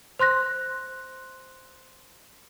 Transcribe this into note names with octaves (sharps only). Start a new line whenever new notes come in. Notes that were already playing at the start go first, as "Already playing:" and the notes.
C5 C6 F#6 A#6